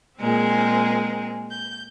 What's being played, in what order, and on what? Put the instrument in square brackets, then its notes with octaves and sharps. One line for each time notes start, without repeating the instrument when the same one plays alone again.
[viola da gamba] A#2 G#3 [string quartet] C4 G#4 A#4
[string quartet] G6